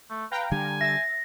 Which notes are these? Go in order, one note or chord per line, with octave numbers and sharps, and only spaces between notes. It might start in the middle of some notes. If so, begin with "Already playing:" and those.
A3
B4 F5 G5 A#5
D3 G3 G#5
E5 A6 A#6